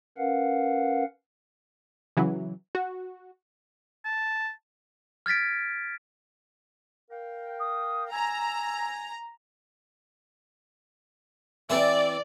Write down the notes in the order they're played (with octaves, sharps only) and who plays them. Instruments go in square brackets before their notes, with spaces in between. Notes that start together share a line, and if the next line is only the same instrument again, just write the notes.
[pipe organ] C#4 A#4 B4 F5 F#5
[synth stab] C#3 E3 F#3
F#4
[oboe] A5
[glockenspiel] F6 G#6 A6 B6 D7
[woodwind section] A#4 F5 G5
[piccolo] D#6
[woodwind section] G#5 [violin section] A#5 [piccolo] E6
[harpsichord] E3 C4 [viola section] D5